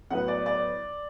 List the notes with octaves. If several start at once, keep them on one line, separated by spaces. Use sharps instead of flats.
A2 F#3 B3 F#5
D5
D5